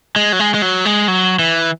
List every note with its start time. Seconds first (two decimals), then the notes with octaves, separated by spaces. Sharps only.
0.16 G#3
0.33 F#3
0.39 G#3
0.54 G#3
0.62 F#3
0.85 G#3
1.08 F#3
1.39 E3